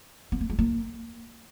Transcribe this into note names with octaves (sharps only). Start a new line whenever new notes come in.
B3
A#3
G#3
A#3